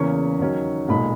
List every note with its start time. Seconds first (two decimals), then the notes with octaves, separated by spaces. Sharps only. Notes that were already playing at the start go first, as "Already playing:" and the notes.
Already playing: E2 C#3 E3 A#3 C#4 C#6
0.39 D#2 D#3 F#3 C#4
0.89 B1 A#2 G#3 B5